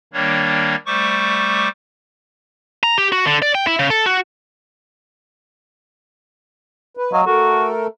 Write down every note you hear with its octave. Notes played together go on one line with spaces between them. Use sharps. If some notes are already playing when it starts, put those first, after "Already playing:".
D#3 G3 A#3 D4 C#5
G3 A3 C5 C#6 D6
A#5
G4
F#4
D3
D5
G5
E4
C#3
A4
F#4
B4
F#3 D#5 F5 G#5
A3 F#4 A4 A#4